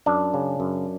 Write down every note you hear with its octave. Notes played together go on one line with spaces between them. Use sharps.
F#2 D4
C#3
F#2